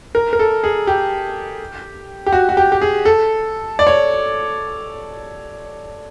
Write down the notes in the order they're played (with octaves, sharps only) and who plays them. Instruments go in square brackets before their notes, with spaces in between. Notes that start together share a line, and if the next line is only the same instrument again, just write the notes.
[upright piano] A#4
A#4
A4
G#4
G4
G4
F#4
F#4
G4
G4
G#4
A4
D5
C#5